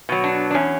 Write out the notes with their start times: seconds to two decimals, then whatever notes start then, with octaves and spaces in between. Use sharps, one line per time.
0.09 B2 F#3
0.24 D4
0.51 D4
0.54 E2 C#4